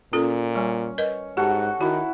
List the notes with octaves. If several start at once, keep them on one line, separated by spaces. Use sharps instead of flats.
A#2 C#4 F4 A4
G3 C#4
A#4 B4 D#5
G#2 F#4 G4 A4
D#3 E4 F#4